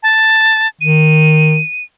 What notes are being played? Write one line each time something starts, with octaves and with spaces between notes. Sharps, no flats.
A5
D#3 D#7